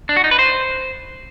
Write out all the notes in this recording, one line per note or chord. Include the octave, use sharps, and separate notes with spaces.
D4
F#4
D#4
B4
C5